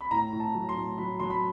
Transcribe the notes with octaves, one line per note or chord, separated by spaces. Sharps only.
B5
A2 A#5
A2
A5
F#3
C6
A2
F#3 B5
F#3 C6
B5